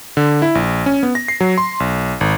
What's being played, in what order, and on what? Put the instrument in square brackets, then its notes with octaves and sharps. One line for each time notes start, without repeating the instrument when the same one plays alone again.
[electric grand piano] D3
E4
A#1
C#4
B3
A#6
C7
F#3
C6
B1
G#1